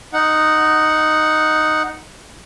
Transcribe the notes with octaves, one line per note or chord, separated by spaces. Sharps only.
D#4 F#5